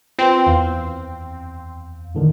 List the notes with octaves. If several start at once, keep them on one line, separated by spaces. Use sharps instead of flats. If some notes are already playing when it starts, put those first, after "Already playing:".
C4 F4 B4
E2 F5
A2 D3 D#3